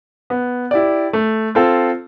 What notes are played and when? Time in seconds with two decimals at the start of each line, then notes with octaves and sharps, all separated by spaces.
0.30 B3
0.71 E4 G4 D5
1.13 A3
1.55 C4 F4 A4